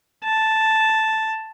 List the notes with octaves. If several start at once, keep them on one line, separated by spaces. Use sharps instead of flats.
A5